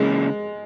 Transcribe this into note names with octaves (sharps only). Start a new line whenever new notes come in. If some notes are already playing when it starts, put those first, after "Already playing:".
Already playing: C#3 E3 G#3 A#3 C#4